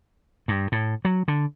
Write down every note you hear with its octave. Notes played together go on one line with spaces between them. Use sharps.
G2
A2
F#3
D3